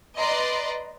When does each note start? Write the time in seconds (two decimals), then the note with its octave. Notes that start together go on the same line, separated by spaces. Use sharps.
0.18 B4 D5 D#5 A#5 C6